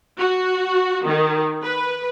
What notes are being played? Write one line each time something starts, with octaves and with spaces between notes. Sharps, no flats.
F#4
D#3
B4